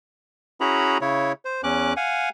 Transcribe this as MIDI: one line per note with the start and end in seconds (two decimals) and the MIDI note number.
0.61 0.98 61
0.61 0.98 64
0.61 0.98 66
0.61 0.98 68
0.61 0.98 82
0.61 0.98 83
1.01 1.32 49
1.01 1.32 64
1.01 1.32 73
1.45 1.61 72
1.64 1.93 40
1.64 1.93 61
1.64 1.93 86
1.64 1.93 90
1.97 2.29 77
1.97 2.29 78
1.97 2.29 80